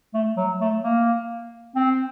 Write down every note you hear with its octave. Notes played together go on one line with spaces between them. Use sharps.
A3
F#3
A3
A#3
C4